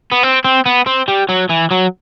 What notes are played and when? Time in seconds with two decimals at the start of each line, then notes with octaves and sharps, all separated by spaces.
0.12 B3
0.23 C4
0.44 C4
0.66 B3
0.87 C4
1.08 G3
1.29 F#3
1.50 E3
1.71 F#3